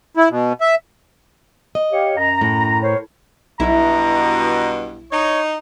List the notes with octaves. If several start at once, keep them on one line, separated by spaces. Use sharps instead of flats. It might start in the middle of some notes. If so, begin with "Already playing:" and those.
E4
B2
E5
D#5
G4 C#5 F5
F#2 A#5
A2
A#4 C5 C#5
B1 G2 B2 E4 A#5
D#4 C#5